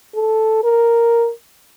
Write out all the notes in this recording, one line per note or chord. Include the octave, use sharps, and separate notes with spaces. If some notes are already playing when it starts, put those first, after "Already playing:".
A4
A#4